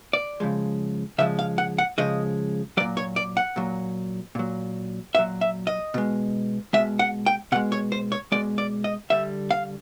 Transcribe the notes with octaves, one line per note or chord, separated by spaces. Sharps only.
D5
C#3 F3 G#3
C#3 F3 G#3 E5
F5
F#5
F#5
C#3 F3 G#3 D#5
A#2 F#3 D5
C#5
D5
F#5
A#2 F#3
A#2 F#3
A#2 F#3 E5
E5
D#5
B2 G#3
B2 G#3 E5
F#5
G5
B2 G#3 F#5
C#5
C5
C#5
B2 G#3 D5
D5
D#5
D3 G3 E5
F5